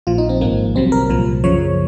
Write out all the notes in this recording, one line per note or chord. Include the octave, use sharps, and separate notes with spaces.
A#1 A#2 F3 F4
D#4
C4
G#1 G#2 F3 A#3
C2 C3 F#3 C4
A#4
C2 A#2 F3
F#2 C#3 F3 C#5